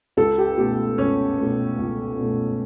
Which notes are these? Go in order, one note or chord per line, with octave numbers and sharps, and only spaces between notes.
C#2 A4
G4
B2 A3 G4
C#2 C#4
B2 A3
C#2
B2 A3